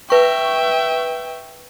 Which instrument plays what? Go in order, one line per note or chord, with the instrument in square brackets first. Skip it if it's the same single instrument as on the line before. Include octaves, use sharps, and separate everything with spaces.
[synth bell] B4 C#6 [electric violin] E5 G5